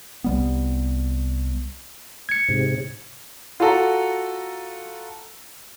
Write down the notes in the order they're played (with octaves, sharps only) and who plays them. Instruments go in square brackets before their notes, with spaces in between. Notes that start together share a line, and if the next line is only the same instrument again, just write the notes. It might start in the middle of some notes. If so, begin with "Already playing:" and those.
[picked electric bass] C2 G3 B3
[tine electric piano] G#6 C#7
[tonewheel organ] G#2 C3
[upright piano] F4 F#4 A4 A#5